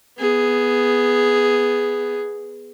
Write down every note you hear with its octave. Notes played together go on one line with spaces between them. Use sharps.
B3 G#4